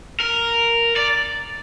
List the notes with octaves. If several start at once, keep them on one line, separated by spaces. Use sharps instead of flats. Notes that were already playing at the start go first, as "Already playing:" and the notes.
A#4
D5